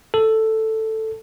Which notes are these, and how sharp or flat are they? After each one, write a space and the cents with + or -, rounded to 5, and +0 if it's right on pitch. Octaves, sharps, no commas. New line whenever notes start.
A4 +5